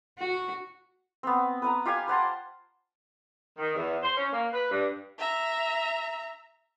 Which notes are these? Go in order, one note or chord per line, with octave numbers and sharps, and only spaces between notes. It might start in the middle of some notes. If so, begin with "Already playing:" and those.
F#4
B3 C4
B4 F#5 A#5
F4 G4 F5 G#5
C5 F#5 A5 C6
D#3
E2
C5
C#4
A#3
B4
G2
E5 A#5